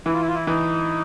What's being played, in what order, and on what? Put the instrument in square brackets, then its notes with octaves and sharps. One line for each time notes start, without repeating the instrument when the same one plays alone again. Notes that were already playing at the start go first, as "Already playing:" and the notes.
[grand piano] E3 [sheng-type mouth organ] E4
[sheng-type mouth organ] F4
E4
F4
E4
[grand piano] E3 [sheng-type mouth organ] D#4